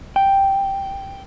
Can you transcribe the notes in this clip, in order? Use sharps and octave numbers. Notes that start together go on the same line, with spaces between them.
G5